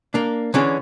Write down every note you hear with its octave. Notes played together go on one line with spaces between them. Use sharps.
A#3 D4
D3 E3 C#4 D4 G#4 C#5